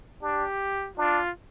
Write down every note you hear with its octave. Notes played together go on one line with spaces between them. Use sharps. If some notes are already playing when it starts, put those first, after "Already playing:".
D4 G4
D4 F4